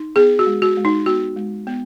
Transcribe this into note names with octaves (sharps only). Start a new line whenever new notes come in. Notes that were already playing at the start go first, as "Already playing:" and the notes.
Already playing: D#4
B3 G#4
F#4
G#3
F#4
G#3
D#4
B3 F#4
G#3
B3